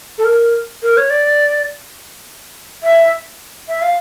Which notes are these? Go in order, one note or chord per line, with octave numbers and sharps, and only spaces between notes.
A4
A#4
A#4
C#5
D5
E5
E5
F5